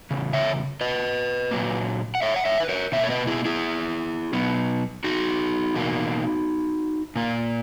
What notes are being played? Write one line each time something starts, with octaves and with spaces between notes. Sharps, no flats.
E2 C#3
C#5 E5
B4 D#5
A#2 F#3 A#3
F#5
C#5 E5
F#5
C#5 E5
B4
A#4 C#5
B2 A#3 C#5 E5
C#5
B4 D#5
E4 G#4
E4 G#4
B2 F#3 B3
D#4 F#4
E2 B2 A#3
A#2 A#3